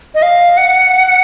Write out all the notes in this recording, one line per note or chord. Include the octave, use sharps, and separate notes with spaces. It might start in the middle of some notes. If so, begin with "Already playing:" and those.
D#5
F5
F#5